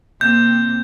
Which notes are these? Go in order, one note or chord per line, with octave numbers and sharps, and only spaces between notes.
C3 A#3 C4 G6